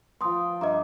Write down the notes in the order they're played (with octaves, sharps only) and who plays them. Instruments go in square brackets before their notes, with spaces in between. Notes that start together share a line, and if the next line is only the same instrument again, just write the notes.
[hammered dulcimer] F3 G5 A5 [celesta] C6 D#6
[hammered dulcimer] G2 [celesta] D#5 E5 A#5